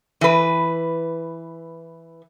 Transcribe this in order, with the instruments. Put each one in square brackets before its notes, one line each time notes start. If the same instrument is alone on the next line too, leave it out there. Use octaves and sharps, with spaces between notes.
[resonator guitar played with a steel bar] E3 B4